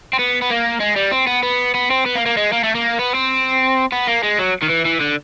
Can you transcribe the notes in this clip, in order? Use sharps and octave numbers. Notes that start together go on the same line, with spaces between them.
C4
B3
B3
A#3
G#3
G3
C4
B3
B3
B3
C4
B3
A#3
A#3
G#3
A#3
A3
A#3
B3
C4
B3
A#3
G#3
F#3
D#3
E3
E3
D3